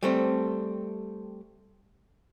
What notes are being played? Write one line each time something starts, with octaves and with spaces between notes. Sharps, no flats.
G3 A3 C4